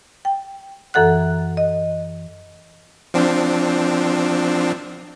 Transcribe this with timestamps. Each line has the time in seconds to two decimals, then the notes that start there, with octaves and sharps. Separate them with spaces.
0.25 G5
0.94 F#2 E3 A4 F#5 F#6
1.57 D#5
3.14 F3 C4 D4